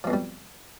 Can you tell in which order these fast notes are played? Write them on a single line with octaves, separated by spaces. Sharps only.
F3 B2 F2 G3